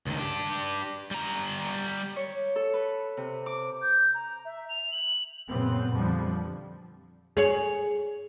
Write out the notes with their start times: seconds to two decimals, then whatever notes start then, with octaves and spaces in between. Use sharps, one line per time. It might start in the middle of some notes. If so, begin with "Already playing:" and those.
0.07 C#2 D#3
0.18 D4 G4
1.11 G3 A#5
2.16 C#5
2.56 A4
2.74 B4
3.17 C3
3.46 D6
3.82 G6
4.14 A#5
4.45 E5
4.69 F7
4.92 F#7
5.50 F#2 A#2 C#3 B3 C4
5.92 F2 D3 F3 G3
7.37 G#4 C#5